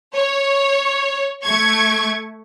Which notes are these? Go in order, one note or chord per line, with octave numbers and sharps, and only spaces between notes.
C#5
A3 C#6 G#6